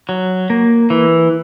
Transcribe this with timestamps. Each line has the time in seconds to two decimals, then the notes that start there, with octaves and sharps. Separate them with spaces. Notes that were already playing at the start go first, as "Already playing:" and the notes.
0.09 F#3
0.50 A#3
0.90 E3